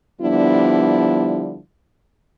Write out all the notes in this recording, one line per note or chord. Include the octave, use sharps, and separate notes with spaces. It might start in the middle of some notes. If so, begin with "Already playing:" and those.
D3 F3 G3 B3 D4 E4